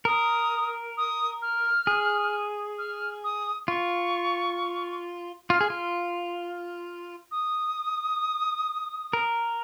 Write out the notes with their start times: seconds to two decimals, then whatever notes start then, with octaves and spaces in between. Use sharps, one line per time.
0.05 A#4 D#6
0.97 D#6
1.42 F6
1.87 G#4
2.78 F6
3.23 D#6
3.68 F4 C#6
5.49 F4 F6
5.61 G#4
5.70 F4
7.31 D#6
9.13 A#4